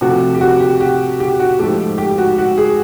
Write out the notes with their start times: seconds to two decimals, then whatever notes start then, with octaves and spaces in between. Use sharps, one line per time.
0.01 C3 F3 A3 F#4
0.35 G4
0.41 F#4
0.60 G4
0.80 G4
1.20 G4
1.40 F#4
1.59 G#2 F3 A3 G4
1.98 G4
2.18 F#4
2.38 F#4
2.58 G#4